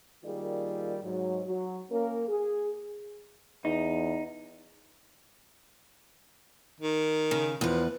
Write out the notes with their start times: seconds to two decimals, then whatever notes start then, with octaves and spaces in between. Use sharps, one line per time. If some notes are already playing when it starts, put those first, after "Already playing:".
0.24 D#3 G3 A#3 F4 G#4 D5
1.03 G#2 F#3
1.46 F#3
1.91 A#3 C#4 A#4
2.28 G#4
3.65 E2 D#4
6.80 D#3
7.31 C#3
7.61 E2 F3 B4